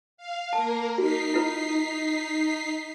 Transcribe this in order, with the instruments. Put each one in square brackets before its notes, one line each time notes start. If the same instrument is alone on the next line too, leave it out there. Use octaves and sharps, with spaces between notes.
[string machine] F5
[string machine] A#3 A#4 [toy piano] A5
[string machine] D#4 B6 C7 [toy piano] F#4
[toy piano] E4 F4 B4